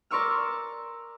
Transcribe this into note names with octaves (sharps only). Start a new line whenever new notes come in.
A#4 D5 C6 C#6 E6 F6